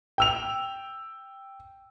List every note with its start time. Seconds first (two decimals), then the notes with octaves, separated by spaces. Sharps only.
0.18 G5 E6 F7